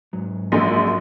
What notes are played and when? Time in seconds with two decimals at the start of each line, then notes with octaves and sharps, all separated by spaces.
0.13 G#2 F#3
0.52 A#1 F#2 G#3